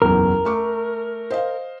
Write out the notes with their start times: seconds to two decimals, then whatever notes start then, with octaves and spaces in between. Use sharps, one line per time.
0.02 F#1 B1 E2 A#4
0.45 A3 C#6 D6
1.31 C5 D#5 F5